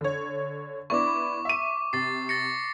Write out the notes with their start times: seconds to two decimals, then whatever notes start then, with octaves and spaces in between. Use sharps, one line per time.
0.01 D3 C#5
0.90 B3 D4 E4 C#6 D6
1.45 E5 D#7
1.93 C3 A6 C7
2.29 A6 A#6 C#7